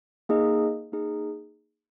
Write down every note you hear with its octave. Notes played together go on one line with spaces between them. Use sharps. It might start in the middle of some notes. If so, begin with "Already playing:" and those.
A#3 D#4 G#4 D#5
A#3 D#4 G#4